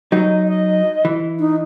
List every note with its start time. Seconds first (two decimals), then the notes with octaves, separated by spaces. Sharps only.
0.12 F#3 D#4 D#5
0.48 D#5
1.05 E3
1.39 D#4